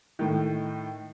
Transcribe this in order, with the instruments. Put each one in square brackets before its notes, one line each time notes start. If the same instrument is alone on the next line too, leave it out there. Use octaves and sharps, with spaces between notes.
[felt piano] A2 D#3